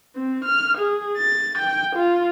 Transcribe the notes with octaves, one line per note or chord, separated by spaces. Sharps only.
C4
F6
G#4
A6
G5
F4